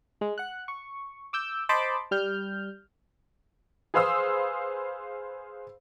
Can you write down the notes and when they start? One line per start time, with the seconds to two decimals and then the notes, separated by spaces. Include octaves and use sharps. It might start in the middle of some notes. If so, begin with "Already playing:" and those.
0.21 G#3
0.38 F#5 F#6
0.68 C#6
1.33 D6 E6 G6
1.69 C5 D#5 A5 B5 C6 D6
2.11 G3 F6 G6
3.94 G#4 B4 C5 F5 D#6 E6